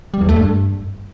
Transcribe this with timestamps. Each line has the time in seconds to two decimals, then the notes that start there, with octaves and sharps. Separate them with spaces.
0.14 G3
0.21 E2
0.29 A3
0.36 G2